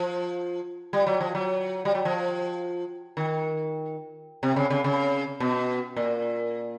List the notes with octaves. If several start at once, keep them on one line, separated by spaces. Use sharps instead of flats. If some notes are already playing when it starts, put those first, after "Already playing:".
Already playing: F3
G3
F#3
F3
F#3
G3
F#3
F3
D#3
C3
C#3
C#3
C#3
B2
A#2